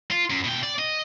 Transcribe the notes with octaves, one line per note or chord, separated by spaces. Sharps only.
F4
F#2
B2 G5
D5
D#5